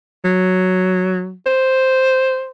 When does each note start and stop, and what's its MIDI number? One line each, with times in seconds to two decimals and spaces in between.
0.25 1.33 54
1.46 2.50 72